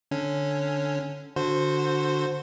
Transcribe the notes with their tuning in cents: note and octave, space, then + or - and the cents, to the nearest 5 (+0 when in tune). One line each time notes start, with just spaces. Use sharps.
D3 +0 C#4 +0
D3 +0 F#4 -15 C5 +0